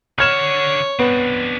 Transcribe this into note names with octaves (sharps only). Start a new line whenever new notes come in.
D3 C#5 F#5 F6 G#6 E7
B3 C4 D4